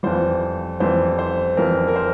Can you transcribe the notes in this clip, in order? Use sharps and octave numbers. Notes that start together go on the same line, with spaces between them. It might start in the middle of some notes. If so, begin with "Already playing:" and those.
F2 E3 G3 C5
F2 E3 G3 C5
C5
F2 E3 G3 A#4
A#4
C5